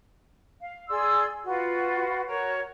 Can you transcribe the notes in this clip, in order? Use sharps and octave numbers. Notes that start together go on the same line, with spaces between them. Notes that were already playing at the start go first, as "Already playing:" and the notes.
F5
G#4 D5 C6 E6
F4 F#4 B4
F#4 A#4 C#5